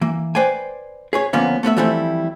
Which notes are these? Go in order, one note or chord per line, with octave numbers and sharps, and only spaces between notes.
E3 A#3
B4 C5 D5 G5 G#5
G#4 B4 C#5
D3 F3 A#3 B3 C#4
A3 B3 B4 E5
E3 F3 G3 A3 C4 E4